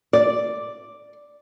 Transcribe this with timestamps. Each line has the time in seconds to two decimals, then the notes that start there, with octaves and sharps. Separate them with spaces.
0.13 D5